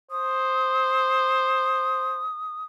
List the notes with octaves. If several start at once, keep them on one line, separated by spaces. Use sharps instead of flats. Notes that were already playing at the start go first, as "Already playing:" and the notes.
C5 D#6